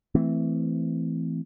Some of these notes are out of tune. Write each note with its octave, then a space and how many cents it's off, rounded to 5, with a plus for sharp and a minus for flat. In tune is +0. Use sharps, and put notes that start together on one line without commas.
E3 +0 A3 +0 C4 -10